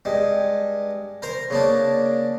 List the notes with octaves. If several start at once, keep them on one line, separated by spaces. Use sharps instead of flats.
G2 G#3
A#4 C5 A#5
C#3 A#3 D4